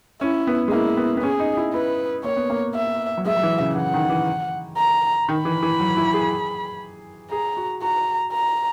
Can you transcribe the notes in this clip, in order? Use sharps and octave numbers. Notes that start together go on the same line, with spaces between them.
C#4 E4
B3
G#3
A#3 E4
B3
B3
C#4 G#4
D#4
E4
E4 B4
A#3 C#5
B3
A#3
E5
F#3
G#3 E5
F#3
E3
C#3
E3 F#5
D#3
E3
A#5
D#3 B5
E3
E3
F#3
E4
G#4
G#4 A#5
F#4
F#4 A#5
A#5